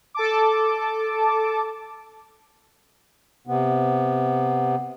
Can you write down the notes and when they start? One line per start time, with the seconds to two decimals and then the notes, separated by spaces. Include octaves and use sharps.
0.14 A4 A5 D6
3.47 C3 B3